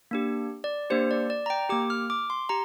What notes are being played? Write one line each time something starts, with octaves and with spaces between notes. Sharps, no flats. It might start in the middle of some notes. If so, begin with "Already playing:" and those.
A#3 D4 G4
D5
A#3 D4 G4 C5
D5
D5
A#5
G5
A#3 G4 D6
F6
D6
C6
G4 A#5